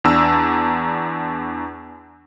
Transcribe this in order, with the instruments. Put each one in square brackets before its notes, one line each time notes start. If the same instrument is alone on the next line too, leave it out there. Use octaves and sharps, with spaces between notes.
[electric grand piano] E2 D4 A5 A#5 E6